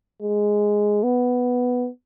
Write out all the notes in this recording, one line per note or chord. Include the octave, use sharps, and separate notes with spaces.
G#3
B3